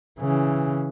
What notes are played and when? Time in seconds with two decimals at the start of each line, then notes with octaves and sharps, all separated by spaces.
0.19 C#3 E3